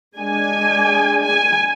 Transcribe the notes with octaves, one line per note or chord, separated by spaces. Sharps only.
G#3 D4 G#5
G#5